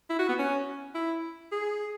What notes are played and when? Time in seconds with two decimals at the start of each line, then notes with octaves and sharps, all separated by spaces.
0.09 E4
0.19 F#4
0.28 B3
0.39 C#4
0.95 E4
1.52 G#4